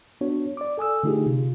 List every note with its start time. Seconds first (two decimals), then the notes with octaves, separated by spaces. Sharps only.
0.21 B3 D4 F#4 C#5
0.57 D5 D6
0.78 A4 G#5 D#6 E6
1.04 D3 A3 D#4 F4 G4 G#4
1.26 C3 F4